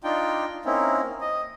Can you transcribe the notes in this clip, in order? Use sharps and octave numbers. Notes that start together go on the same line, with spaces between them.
D4 D#4 F4 G5
A#3 C4 C#4 D#4 E4
D#5